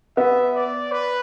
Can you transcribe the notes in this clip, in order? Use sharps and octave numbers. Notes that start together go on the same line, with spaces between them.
B3 E5
D5
B4